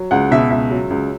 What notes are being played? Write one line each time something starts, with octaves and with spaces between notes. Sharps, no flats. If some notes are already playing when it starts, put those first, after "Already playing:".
Already playing: F#3
C#2 F#5
B2 E5
C#2 E5
F#3
C#2